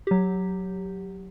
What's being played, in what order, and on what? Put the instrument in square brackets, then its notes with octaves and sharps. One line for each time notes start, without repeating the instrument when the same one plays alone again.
[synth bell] F#3 G4